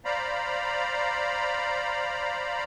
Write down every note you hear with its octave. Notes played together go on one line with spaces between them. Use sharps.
C5 D5 F5 A#5 B5